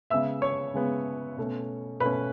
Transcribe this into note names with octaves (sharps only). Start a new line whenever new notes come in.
C#3 G#3 B3 E5 E6
C#5 C#6
C#3 G#3 B3
B2 A3 C#4
B2 A3 C#4 B4 B5